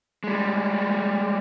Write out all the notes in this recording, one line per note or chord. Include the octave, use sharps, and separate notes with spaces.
G3 G#3